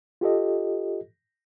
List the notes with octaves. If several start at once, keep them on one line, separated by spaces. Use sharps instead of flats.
F4 G4 A4 D#5